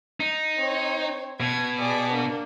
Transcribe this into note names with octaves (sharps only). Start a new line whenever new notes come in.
D#4
C4 C#5
B2 G#6
G#4 D5
A#3 D4